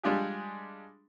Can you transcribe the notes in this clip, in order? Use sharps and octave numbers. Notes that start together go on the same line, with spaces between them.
G3 G#3 D4 F4 G4 G#4